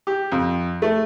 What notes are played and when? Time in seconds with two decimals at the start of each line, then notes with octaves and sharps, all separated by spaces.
0.07 G4
0.32 F2
0.82 A3